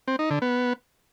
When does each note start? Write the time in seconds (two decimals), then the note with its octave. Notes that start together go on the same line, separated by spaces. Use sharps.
0.08 C4
0.19 D#4
0.30 D3
0.42 B3